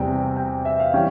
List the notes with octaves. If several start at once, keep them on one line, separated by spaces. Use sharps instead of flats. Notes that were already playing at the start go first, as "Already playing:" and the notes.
Already playing: E2 C3 G3 G5
G5
E5
F5
E3 G3 C#4 G5